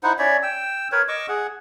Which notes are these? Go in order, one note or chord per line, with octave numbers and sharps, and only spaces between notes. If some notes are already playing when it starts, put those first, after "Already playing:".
D#4 E4 C5 F#5
C#4 C#5 D5 E5
G5 E6
A#4 B4 C#5
D#5 C#6 D6 E6
G#4 F#5